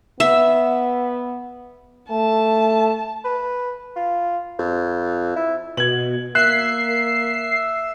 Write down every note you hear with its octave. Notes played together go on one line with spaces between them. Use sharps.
B3 E5
A3 A5
B4
F4
F2
E4
B2 G#6 F#7
A#3 E5 F#6 C7